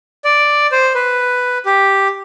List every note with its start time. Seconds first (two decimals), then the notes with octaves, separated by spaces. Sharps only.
0.25 D5
0.72 C5
0.95 B4
1.66 G4